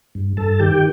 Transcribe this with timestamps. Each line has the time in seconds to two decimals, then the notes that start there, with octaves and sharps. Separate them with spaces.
0.15 G2
0.37 G2 A4 A5
0.59 D#3 G4 G5